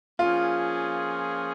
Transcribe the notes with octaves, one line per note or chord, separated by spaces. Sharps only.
F3 A#3 C#4 F4 G#4